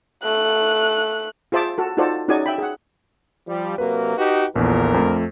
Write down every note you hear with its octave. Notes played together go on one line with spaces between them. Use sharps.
A3 F#6
F4 G#4 C5 E5 A5 D6
F#4 A4
D#4 F4 F#4 A4 C5 D5
C#4 D#4 F#4 G#4 D5 G#5
E5 G5 B5
G#4 F#5
F3 G3
C3 F#3 A#3 B4
D#4 F#4 G4
A#1 E2 D3 F3 A#4
F2 A3